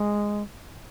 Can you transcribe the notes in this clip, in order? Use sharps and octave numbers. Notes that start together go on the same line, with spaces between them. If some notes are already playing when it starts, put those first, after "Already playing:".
Already playing: G#3